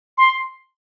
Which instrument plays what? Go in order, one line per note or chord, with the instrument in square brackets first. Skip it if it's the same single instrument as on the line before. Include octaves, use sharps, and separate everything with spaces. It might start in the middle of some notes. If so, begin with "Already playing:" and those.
[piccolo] C6